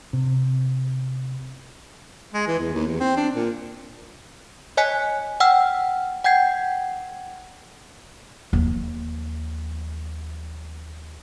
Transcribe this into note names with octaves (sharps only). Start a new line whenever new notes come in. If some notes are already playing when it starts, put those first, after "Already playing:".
C3
G#3
E3
E2
D#2
E2
C4
D4
A#2
C#5 D#5 G#5 F#6 B6
F#5 G5 E6 F6
F#5 G5 G6 G#6 C7
D#2 F3